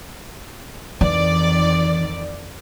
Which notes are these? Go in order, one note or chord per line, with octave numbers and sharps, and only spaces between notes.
F2 D#3 E3 D5